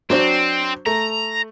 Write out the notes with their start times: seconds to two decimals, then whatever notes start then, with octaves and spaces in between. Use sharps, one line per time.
0.10 F#3 C4 D4 C5
0.86 A3 A#5